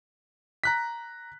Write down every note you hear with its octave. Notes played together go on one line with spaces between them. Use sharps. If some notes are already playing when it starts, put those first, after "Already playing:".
A#5 F#6 B6